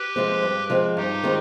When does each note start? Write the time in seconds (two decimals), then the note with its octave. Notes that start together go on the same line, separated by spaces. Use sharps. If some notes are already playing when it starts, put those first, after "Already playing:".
Already playing: G4 B4
0.16 F3 G#3 C4
0.42 G2
0.70 F3 G#3 C4
0.96 G2 D#4 G4
1.23 D#3 G#3 C4 F4